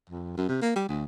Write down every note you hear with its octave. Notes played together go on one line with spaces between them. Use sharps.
F2
F#2
C3
A#3
G3
D2